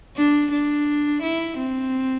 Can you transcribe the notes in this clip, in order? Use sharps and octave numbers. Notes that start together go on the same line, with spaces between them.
D4
D4
E4
C4